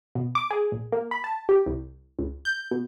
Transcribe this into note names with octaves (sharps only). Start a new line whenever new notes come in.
B2
D6
G#4
A#1
A#3
B5
A5
G4
C2
C#2
G6
B2